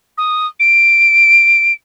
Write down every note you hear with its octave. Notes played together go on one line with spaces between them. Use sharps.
D#6
D7